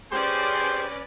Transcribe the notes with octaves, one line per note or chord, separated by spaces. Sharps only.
C#4 G4 G#4 B4 C5 D5